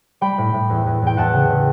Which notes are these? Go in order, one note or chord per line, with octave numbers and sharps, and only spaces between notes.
G3 G5 B5
A2
A2
E2
E2
E2 G5
E2 F#5 A5
C#3
C#3